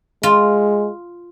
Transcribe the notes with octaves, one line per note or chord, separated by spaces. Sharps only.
G#3 F4